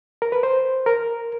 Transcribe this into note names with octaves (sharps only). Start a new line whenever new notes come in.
A#4
B4
C5
A#4